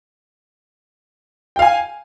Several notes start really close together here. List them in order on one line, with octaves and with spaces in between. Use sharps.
G5 F5 G#5